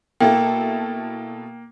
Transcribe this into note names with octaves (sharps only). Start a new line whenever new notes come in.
B2 A#3 E4 A4 G5